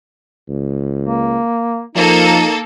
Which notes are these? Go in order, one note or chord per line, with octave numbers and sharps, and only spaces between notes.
C#2
A#3
F3 A#3 D#4 A4